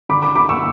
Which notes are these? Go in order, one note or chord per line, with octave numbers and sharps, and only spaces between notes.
D3 B5 D6
B5 D6
D3 B5 D6
C#6 E6